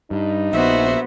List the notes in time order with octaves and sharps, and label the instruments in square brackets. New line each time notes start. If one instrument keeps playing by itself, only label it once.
[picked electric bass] G2 [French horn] D#4
[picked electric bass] A#1 [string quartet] B3 F#4 C5 [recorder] E5